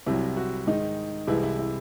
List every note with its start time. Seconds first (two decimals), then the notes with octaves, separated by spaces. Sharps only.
0.06 C2 C3 F#3 E4
0.37 F#4
0.67 G#2 D#3 G#3 D#4
1.27 C2 C3 E3 G#3 E4
1.43 E4
1.58 E4